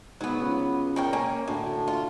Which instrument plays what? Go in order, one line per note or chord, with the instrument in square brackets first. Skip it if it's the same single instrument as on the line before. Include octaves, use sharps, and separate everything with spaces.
[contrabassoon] G#2 [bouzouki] F#3 B3
[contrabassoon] C#2
[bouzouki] A#4 C#5 G5
A#3 C#4
[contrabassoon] D2 [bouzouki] A2
[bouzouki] F4